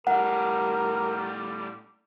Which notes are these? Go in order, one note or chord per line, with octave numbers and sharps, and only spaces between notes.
A2 G3 A#4 F#5